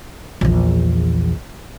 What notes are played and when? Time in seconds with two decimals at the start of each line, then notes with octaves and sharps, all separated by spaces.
0.41 A#1 E2